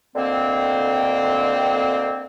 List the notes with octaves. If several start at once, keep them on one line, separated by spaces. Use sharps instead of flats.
D2 D3 D#3 A#3 C4